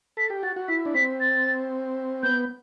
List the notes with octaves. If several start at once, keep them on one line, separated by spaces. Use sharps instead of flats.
A4 B6
G4
F#4 A6
F#4
E4 B6
D4
C4 B6
A6
B3 G6